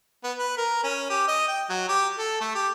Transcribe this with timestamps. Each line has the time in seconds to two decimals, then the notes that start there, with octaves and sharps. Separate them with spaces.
0.23 B3
0.38 B4
0.57 A#4
0.84 C#4
1.10 G4
1.28 D#5
1.48 G5
1.69 F#3
1.89 G4
2.18 A4
2.40 A3
2.55 G4